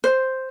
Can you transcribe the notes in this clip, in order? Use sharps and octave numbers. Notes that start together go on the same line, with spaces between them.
C5